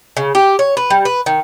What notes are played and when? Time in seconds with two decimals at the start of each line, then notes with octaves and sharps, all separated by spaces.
0.17 C#3
0.35 G4
0.59 C#5
0.77 B4
0.90 G3
1.05 B4
1.26 D#3